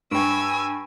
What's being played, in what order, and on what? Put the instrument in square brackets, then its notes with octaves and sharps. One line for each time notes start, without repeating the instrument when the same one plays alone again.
[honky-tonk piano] G2 [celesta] G5 C#6 D7 [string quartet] G#5 E6